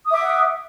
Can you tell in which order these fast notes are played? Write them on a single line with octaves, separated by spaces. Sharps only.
D#6 E5 D6 F#5